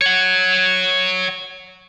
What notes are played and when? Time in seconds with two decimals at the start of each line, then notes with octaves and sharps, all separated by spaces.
0.01 C#5 F#5